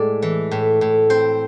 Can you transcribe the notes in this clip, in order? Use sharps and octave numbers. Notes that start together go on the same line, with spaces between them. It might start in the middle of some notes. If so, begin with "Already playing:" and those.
Already playing: A2 G#3 D5
E3
A2
A2
C4 C5